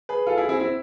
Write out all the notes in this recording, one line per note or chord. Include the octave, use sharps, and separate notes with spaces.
G#4 B4
F4 A4
E4 G#4
C4 E4
C4 E4